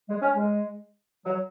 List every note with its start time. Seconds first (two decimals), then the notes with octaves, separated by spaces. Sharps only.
0.09 G#3
0.22 C#4
0.35 G#3
1.25 F#3